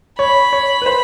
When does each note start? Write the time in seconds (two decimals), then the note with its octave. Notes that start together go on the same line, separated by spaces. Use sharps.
0.19 C#5 B5
0.53 C#5
0.82 B4
0.86 C5